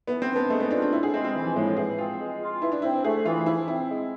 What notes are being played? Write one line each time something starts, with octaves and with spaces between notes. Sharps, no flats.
E3 B3
C4
D4
B3
G#3 A3
B3
D4 F4
D4
A2 E4
G#4
G#3 C4
C4
E3 E4
F3
A2 G#3
F4
E3 G#4
C4 F4
G#3
F4
E3 E4
D4
C4 E4
A3 G#4
E3 F4
F3 E4
C4 E4
G#3